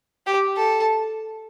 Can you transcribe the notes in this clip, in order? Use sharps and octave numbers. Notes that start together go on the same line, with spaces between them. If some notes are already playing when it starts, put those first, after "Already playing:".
G4
A4